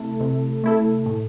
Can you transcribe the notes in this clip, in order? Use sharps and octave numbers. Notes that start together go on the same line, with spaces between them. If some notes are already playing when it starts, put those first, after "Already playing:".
Already playing: C3 A3 E4 A4
C3
A3 E4 A4
A2